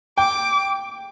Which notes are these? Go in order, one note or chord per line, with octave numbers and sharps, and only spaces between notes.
G5 D6